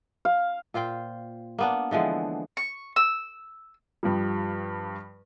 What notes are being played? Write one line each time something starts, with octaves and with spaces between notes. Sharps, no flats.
F5
A#2 F4 C5 G5
A#3 B3 D4
D3 E3 F3 G#3
C#6
E6
G2 F3 G3